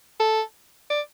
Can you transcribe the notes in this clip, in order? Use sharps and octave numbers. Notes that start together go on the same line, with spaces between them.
A4
D5